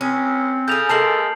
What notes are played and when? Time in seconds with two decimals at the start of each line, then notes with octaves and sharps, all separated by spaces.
0.01 C#2 C4 C#4
0.68 C#3 G#4 A4 G6 F7
0.89 G#3 A#3 A4 A#4 A5 C7 F#7